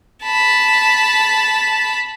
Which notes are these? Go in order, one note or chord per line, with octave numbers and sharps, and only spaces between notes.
A5 B5